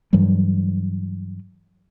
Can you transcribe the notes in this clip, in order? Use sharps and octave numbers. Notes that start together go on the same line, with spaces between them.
G2 E3 F#3 G3